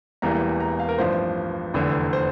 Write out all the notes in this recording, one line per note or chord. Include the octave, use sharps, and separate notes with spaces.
E1 E2 E3 G3 A#3 A#5
A#5
F5
A#4
A1 G2 F3 C5
F1 E2 D3
C5